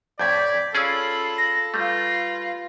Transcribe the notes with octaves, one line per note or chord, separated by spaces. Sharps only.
F2 A2 D5 G6 G#6 B6
C#4 F4 G#4 A4 D5 B5 E6 C7
A#6
G3 A3 F4 B4